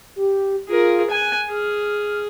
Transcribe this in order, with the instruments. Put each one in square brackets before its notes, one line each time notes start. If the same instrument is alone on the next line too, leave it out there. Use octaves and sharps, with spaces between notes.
[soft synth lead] G4
[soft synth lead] F4 [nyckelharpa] G#4 A#4
[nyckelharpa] G#5 [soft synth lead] F#6
[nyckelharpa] G#4 [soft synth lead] F6